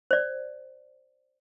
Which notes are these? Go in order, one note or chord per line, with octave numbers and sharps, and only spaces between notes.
C5 D5